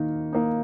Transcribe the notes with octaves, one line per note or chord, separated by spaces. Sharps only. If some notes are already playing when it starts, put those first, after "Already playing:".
Already playing: D#3 A#3 D#4
A#3 D#4